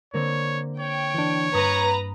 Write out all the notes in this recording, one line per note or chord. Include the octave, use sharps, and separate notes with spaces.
D3 A#3 C4 C#5
C#5 G5
E3 D4
G2 B4 A#5 D#6 A#6